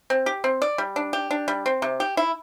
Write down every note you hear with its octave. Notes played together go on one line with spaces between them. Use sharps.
C4
G4
C4
D5
G3
D4
G4
D4
G3
C4
C3
G4
E4